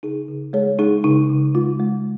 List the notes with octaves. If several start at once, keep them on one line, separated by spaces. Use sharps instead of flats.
C#3 D#4 G#4
C#3
G#3 G#4 C#5
G#3 D#4 G#4
C#3 D#4
C#3
G#3 F4
G#3